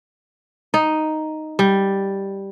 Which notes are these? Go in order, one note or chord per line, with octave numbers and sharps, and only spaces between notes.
D#4
G3